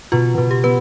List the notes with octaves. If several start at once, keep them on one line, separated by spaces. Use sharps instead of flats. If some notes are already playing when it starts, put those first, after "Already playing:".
B2 F4
B2
G4
B3 B4